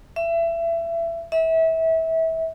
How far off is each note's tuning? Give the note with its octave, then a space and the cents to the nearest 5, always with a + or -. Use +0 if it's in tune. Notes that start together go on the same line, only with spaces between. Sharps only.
E5 +25
E5 -25